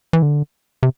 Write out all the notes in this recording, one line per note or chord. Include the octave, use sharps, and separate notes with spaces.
E3
D3
C3